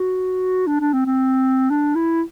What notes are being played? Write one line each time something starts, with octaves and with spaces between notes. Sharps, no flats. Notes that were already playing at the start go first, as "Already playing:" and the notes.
Already playing: F#4
D4
D4
C4
C4
D4
E4